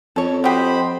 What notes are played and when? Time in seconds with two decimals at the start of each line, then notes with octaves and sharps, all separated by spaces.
0.16 F2 A4 C#5
0.44 F#4 G4 C5 D#5 B5